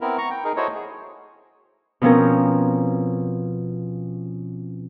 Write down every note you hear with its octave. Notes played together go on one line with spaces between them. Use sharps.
B3 C4 E4 A#4
A#5 C#6
G5
D#4 G#4 A#4
E4 F#4 A4 C5 C#5 D#5
G#4
B2 F3 C4 C#4 A#4